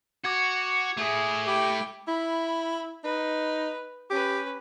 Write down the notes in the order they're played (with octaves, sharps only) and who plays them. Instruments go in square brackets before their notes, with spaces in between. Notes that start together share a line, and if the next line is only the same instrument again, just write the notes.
[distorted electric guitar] F#4 [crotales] D6 G#6
[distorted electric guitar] A3 E4 [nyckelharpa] G#4
[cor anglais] G4 [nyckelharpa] G5 B5
[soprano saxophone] E4 [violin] B5
[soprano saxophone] D#4 [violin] B4
[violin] C#4 B4 [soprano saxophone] G4